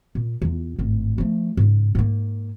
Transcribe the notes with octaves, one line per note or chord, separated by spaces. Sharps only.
A#2
E2 F4
G#1 A2
F3 A3
G#2 C#3
G#2 A#3